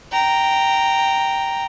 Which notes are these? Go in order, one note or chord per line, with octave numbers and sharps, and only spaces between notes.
G5 A#5